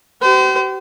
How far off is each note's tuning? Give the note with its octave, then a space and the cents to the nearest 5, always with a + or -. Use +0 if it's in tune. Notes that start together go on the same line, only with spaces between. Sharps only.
G4 -40 C5 -35